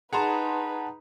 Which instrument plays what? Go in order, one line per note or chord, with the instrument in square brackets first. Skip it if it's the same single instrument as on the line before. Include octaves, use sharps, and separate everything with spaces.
[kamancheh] D#4 B4 [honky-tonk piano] G#4 A#5 C6 [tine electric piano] F#5 A5